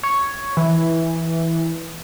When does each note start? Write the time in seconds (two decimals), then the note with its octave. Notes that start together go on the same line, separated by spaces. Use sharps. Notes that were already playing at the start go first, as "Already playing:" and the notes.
0.03 C#5
0.57 E3